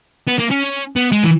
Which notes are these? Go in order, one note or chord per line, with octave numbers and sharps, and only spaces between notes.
B3
A#3
C#4
B3
G#3
E3